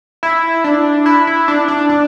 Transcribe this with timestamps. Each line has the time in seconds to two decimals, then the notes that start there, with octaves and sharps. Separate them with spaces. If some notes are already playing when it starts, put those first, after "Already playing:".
0.23 E4
0.64 D4
1.06 E4
1.27 E4
1.48 D4
1.68 D4
1.89 D4